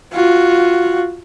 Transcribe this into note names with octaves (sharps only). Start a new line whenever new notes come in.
F4 F#4